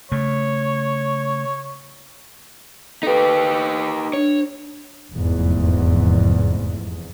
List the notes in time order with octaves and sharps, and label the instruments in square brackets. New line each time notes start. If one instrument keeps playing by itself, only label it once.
[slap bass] C#3 A3 [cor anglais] C#5
[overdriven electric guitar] D#4 G4 [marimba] A4 B4
[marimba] D4 [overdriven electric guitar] C#5
[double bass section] F1 E2 G#2